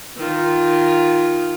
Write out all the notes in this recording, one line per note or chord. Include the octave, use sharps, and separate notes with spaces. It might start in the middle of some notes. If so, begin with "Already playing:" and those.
D#3 F4